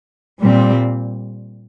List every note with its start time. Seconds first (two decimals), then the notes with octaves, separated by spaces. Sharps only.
0.42 A#2 G3 C4